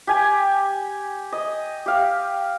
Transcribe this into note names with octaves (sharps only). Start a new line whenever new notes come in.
G4 G#5
D#5
G4 F5